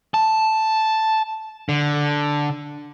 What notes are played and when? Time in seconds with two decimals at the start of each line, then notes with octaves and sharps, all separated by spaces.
0.14 A5
1.69 D3